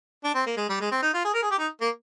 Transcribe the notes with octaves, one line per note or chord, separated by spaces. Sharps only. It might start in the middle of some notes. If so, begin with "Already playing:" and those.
D4
C4
A#3
G#3
G3
G#3
C4
D#4
F4
G#4
A#4
G#4
G4
D#4
A#3